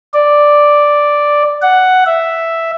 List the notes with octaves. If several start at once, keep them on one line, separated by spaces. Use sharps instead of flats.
D5
F#5
E5